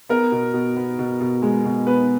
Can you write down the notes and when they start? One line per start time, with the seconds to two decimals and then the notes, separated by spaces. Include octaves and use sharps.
0.09 B3 A#4
0.32 B2
0.54 B2
0.77 B3
0.99 B2
1.21 B2
1.42 G#3
1.65 B2
1.87 B3 B4